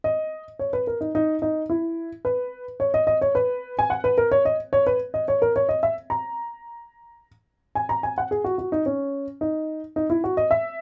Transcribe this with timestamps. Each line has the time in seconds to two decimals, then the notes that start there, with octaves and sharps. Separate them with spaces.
0.04 D#5
0.59 C#5
0.73 B4
0.87 A#4
1.01 D#4
1.15 D#4
1.42 D#4
1.70 E4
2.25 B4
2.80 C#5
2.94 D#5
3.07 D#5
3.21 C#5
3.35 B4
3.79 G#5
3.90 F#5
4.04 B4
4.18 A#4
4.31 C#5
4.45 D#5
4.73 C#5
4.87 B4
5.14 D#5
5.28 C#5
5.42 A#4
5.56 C#5
5.69 D#5
5.83 E5
6.10 A#5
7.75 G#5
7.89 A#5
8.03 G#5
8.18 F#5
8.31 G#4
8.44 F#4
8.58 F#4
8.72 D#4
8.86 C#4
9.41 D#4
9.96 D#4
10.10 E4
10.24 F#4
10.37 D#5
10.51 E5